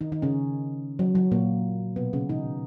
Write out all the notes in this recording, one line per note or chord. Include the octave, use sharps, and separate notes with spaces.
D#3 D#4
D#3 D#4
C#3 C#4
F#3
F#3
A#2 A#3
B2 B3
C#3 C#4
D#3 D#4